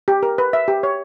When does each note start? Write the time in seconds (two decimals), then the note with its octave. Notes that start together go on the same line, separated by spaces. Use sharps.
0.08 G4
0.23 A#4
0.38 B4
0.53 E5
0.68 G4
0.83 C#5